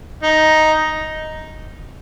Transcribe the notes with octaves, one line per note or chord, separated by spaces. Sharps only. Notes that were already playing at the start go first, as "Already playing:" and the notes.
D#4